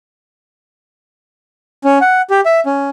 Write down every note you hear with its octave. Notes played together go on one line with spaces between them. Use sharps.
C#4
F#5
G4
E5
C#4